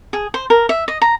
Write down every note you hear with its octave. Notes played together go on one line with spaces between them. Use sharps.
G#4
C5
A#4
E5
D#5
A#5